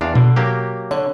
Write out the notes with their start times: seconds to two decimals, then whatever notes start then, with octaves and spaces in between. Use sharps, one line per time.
0.01 E2 D4 F5
0.15 B2 D3
0.36 F#3 A#3 G4
0.91 D3 C#5